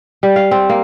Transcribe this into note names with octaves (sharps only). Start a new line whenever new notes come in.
G3
F5
C4
A#3